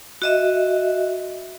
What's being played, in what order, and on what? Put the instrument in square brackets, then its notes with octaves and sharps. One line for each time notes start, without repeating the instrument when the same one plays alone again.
[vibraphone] F#4 D#5 E5